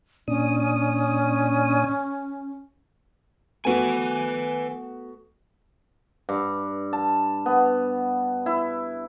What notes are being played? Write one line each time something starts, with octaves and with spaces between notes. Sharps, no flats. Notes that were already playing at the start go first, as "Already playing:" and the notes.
A#2 C#4 D4 D#6
A3 B3 F#4 B4 G#5
G2
A5
B3
E4